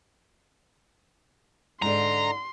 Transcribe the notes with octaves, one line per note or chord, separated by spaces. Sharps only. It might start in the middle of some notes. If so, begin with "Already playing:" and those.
G#2 D3 A#5 C6